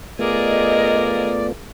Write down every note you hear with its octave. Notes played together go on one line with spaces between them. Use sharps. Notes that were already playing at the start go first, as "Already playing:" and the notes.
A3 B3 F4 G#4 A#4 D5 D#5